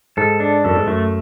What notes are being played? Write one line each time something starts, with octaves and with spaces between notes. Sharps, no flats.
G#2 A4
D4
F#2 A4
G#2
F#2 A3